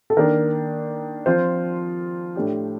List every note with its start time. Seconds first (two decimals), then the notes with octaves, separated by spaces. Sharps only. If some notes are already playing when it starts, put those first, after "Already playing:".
0.10 A4
0.17 D#3 A#3 D4 A#4
1.26 F3 C4 F4 C5
2.36 A2 A3 D4 G4